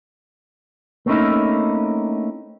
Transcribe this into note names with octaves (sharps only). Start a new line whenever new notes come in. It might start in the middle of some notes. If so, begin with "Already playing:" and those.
A3 A#3 C4 C#4 D#4 E4